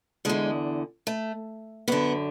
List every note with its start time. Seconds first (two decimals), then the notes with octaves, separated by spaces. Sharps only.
0.25 E2 D3 G#3
1.07 A3
1.88 F#2 D3 B3